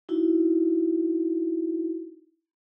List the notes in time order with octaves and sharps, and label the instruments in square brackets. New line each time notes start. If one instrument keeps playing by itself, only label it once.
[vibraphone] D#4 E4 F#4